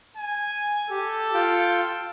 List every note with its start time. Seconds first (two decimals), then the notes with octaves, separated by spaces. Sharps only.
0.17 G#5
0.90 G4 A4
1.34 F4 G5